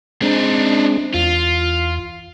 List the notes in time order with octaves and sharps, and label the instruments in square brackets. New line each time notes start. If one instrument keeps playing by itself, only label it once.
[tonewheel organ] G#3 C4 [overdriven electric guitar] D4 D#4
[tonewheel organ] E2 [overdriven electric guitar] F4